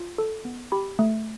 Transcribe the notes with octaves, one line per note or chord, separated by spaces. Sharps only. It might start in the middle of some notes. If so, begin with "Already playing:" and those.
Already playing: F4
A4
B3
G4 B5
A3